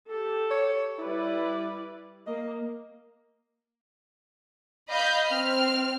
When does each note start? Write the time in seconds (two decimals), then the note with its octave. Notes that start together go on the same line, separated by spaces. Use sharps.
0.10 G4 A4
0.51 C#5
0.99 G3 E4 B4 D5
2.27 A#3 D#5
4.89 D#5 F5 B5 G6
5.28 C4 F6